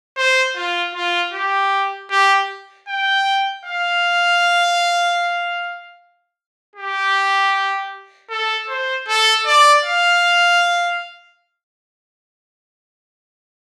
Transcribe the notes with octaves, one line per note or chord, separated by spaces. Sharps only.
C5
F4
F4
G4
G4
G5
F5
G4
A4
C5
A4
D5
F5